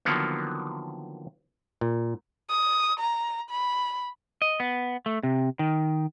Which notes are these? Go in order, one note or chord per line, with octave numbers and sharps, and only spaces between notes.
D3 D#3 F3 F#3 A#3 B3
A#2
D#6
A#5
B5
D#5
B3
A3
C3
D#3